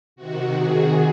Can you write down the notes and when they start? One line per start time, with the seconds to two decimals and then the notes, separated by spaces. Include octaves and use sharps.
0.16 C3 D#3 F#4
0.56 G#4